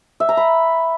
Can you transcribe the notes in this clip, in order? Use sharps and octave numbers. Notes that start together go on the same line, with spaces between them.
E5
A#5
B5